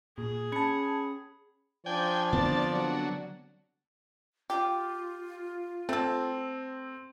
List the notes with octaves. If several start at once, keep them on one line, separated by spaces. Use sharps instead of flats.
A#2 G#4
C#4 A5 B5 G#6 C#7
F3 D4 D5 G5 G#5
D3 B3 C4 A5
F#3
F4 G4
A3 C4 A4